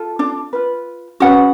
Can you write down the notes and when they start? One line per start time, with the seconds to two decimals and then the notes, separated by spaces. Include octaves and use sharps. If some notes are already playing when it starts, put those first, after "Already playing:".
Already playing: F4 A4
0.19 D4 D5
0.53 F4 B4
1.20 C#4 F#4 G#4 B4 F#5